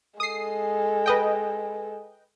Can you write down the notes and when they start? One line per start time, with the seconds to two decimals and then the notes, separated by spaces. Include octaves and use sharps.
0.20 G#3 A4 D#6 C7
1.06 B4 D#5 G5